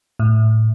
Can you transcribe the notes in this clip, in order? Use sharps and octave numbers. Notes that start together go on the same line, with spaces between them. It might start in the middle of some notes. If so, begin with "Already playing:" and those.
A2